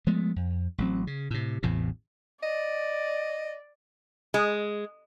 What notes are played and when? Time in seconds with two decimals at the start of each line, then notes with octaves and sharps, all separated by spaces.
0.07 F3 G#3 A3 B3
0.36 F2
0.78 A1 F#3 C4
1.07 C#3
1.31 A2 C3
1.63 A1 E2 A2 C3
2.43 D5 D#5
4.34 G#3